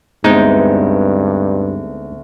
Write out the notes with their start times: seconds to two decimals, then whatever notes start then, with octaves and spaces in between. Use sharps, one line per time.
0.24 D2 G2 G#3 B3 C4 D#4